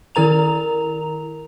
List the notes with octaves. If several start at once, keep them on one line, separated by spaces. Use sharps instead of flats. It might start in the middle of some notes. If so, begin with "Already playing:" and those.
D#3 E4 A#4 A#5 F7